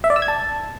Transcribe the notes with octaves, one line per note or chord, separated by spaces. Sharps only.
E5
D5
E6
G#6
A5